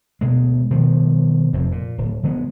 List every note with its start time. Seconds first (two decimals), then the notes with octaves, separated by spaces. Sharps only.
0.21 D2 B2 G#3
0.70 B2 D#3 F3 G3
1.53 F1 F2 C3
1.72 A#2
1.98 D1
2.23 D3 F3 G#3 B3